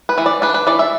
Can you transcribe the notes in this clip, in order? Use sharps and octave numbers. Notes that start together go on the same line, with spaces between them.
B4
E3
D5
D4 B4
B4
E3 D5
E5